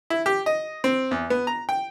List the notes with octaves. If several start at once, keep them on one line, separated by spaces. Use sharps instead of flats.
E4
G4
D#5
C4
E2
B3
A#5
G5